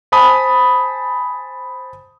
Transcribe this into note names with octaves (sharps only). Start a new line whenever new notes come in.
C5 G#5 A5 B5 D#6